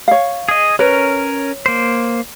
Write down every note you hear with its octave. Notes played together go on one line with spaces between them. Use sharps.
C#5 F5
G#4 D#5
C#4 A#4 B4 C#5
A#3 C5